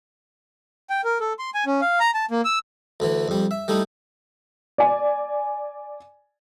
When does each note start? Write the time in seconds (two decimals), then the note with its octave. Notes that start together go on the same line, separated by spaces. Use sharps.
0.90 G5
1.04 A#4
1.20 A4
1.39 C6
1.54 G#5
1.66 C#4
1.81 F5
2.00 A#5
2.14 A5
2.31 A#3
2.45 E6
3.00 D2 D3 E3
3.28 F2 G3
3.51 E5
3.68 G3 A3 D#4 E4
4.78 D5 G#5